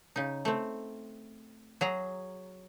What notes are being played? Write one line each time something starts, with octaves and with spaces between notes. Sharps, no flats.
C#3 D#4
A3 C4
F#3 G#4 A#5